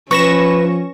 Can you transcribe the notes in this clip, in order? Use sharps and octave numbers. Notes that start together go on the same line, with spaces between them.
F3 C#4 B4 C#6 A#6 E7